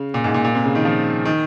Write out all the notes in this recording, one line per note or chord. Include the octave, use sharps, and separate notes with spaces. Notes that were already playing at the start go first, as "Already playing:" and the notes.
Already playing: C#3
A#2
G#2
A#2
A#2
C3
C#3
D#3
F3
D#3